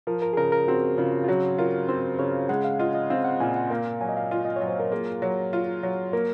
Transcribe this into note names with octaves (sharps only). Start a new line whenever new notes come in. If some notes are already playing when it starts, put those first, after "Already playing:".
F3 A#4
A#4
G#4
C#3 A#4
A#4
C4 F#4
C#3 F4
F4
F#3 F#4
F4 A#4
C4 C5
C#3 C#5
G#3 F#5
F5
F4 D#5
D#5
C4 F5
F#5
A#2 G#5
F#5
A#3 F5
F#3 G#5
D#5
F5
F4
D#5
F#3 C#5
C5
A#4
A#3 G#4
F#3
F4
F#3
A#3 A#4